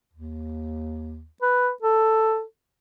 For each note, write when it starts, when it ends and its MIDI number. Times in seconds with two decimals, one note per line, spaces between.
0.13 1.25 39
1.42 1.70 71
1.82 2.42 69